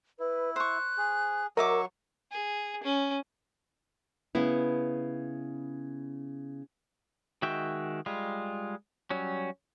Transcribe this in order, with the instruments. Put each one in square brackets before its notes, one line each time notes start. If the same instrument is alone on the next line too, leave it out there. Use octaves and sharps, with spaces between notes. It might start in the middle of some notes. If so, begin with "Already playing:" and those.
[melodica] E4 [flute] B4
[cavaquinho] C5 C#6 [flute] F#6
[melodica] G#4
[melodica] F#3 C#6 [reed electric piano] A#4 [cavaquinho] D#5 E5 D6
[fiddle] G#4
C#4
[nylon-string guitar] C#3 B3 E4
[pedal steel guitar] D#3 G#3 F#4 E5 G5
G3 G#3 F4
F#3 G3 C#4